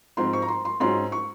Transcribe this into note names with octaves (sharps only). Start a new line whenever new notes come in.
G#2 F3 C4 C6
C#6
A#5
C6
C6
G#2 F#3 C#4 F4 C6
C#6